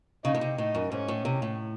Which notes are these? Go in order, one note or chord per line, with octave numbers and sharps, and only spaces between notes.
C#3 D#4
A2
C3
A2 D#4
F#2
G#2 C#4
A2
C3
A2